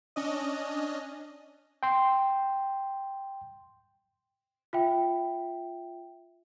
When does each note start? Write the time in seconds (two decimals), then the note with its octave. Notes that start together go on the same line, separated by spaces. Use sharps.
0.16 C#4 D4 D#5
1.83 G5 C6
4.73 F4 E5 G5